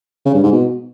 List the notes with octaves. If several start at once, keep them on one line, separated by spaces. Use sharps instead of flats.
C#3
G2
G#2
B2